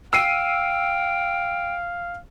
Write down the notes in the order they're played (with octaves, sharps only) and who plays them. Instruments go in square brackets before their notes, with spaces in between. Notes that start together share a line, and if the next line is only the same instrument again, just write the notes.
[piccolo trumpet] F5 [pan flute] G5 [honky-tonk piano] E6 C7 D#7